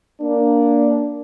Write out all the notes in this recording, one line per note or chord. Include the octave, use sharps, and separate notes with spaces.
A#3 D4